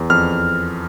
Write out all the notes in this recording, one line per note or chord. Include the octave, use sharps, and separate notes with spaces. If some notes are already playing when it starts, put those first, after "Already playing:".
Already playing: E2
F2 F6